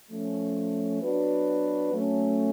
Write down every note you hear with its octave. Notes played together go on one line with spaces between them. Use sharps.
F3 A3 C#4
F#3 B3 D4 F#4 B4
F#3 A3 C#4